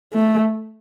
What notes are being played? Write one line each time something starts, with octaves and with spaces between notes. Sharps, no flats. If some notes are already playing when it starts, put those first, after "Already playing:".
A3